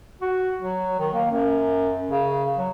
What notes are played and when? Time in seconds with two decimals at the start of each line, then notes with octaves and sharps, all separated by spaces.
0.22 F#4
0.61 F#3
0.99 D#3
1.13 A#3
1.31 F#2
2.09 C#3
2.58 F#3